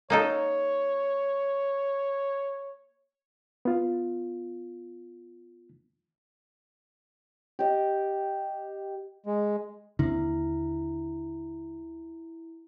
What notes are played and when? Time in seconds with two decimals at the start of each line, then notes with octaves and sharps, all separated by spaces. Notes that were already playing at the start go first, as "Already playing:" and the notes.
0.10 A#3 D#4 A4 C#5
3.65 B3 F4
7.59 G4 D#5
9.26 G#3
9.99 D#2 D3 A#3 C4 D4 E4